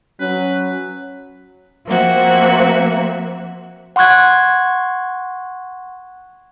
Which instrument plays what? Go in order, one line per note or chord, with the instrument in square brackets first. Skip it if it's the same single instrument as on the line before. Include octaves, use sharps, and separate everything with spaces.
[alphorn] F#3 [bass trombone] C#4 [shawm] B4
[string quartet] F3 A#3 C4 F#4 E5
[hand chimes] F#5 C6 C#6 F#6 G#6